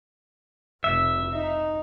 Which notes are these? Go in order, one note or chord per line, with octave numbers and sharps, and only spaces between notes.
F1 E5
D#4